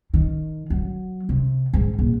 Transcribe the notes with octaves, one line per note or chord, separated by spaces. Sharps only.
D#3
F#3
C3
G#2
A#1